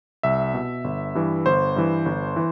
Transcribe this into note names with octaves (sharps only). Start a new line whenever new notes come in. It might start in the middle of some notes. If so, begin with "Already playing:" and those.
C2 E5
B2
G1
G2 E3
G1 C5
G2 E3
G1
E3